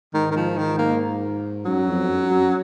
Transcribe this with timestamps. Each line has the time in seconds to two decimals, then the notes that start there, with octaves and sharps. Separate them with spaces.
0.14 G#2 D#3
0.31 D#3
0.36 F3
0.58 D#3
0.79 A#3
1.65 F#2 F#3
1.87 F2
2.08 F#2
2.30 F#2